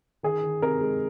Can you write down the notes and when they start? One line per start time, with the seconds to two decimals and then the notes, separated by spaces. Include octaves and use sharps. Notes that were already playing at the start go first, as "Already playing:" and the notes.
0.23 D#3 G#4
0.43 D#3
0.62 C3 A#4
0.81 G#3